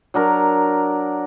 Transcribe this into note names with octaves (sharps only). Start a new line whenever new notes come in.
F#3 D4 A#4